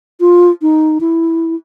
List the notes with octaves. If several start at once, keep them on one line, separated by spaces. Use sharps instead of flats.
F4
D#4
E4